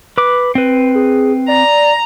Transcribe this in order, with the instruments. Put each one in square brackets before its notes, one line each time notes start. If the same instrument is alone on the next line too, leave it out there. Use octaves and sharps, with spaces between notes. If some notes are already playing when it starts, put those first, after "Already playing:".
[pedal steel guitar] B4 D6
C4 B4
[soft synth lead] G#4
[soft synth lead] D5 [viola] A#5